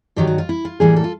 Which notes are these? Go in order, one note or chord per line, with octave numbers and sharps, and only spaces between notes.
G2 D#3 F#3 G4
F#4
F4
E4
F4
A2 E3 G3 A#3 G#4
A4
F4